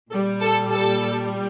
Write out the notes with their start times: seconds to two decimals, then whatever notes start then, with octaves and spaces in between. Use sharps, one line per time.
0.12 A#2 G3 A4
0.41 A4
0.70 A4